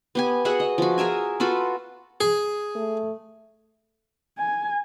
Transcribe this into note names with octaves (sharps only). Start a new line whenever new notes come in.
B3 G4 G#5
F#4 G#4 E5 F#5
D#5
F3 F#4
G#4 A#4 E5 G#5
F4 F#4 A4 B4
G#4
A3
G#5